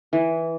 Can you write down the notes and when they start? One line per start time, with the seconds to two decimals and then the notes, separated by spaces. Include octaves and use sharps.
0.13 E3